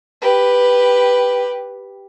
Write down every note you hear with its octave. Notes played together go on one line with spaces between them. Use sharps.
G4 B4